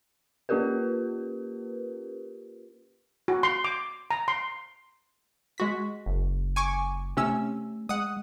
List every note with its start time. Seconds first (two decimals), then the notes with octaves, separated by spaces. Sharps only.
0.49 A#3 C#4 F4 G4 A#4 B4
3.28 F#4
3.43 C6
3.64 D6
4.11 A#5
4.28 C6
5.58 G#3 F#4 B6
6.06 F#1
6.56 G#5 C#6 D6
7.17 C3 A3 C#4 E6
7.89 G#3 F#5 D#6